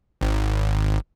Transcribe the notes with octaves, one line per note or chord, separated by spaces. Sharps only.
G#1